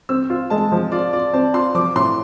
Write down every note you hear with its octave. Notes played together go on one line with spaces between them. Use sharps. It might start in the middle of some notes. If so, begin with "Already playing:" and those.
C4 E6
F4
G#3 A5
F3
F4 D5
F4 D5
C4 A5
F4 C6
F3 D6
A2 C6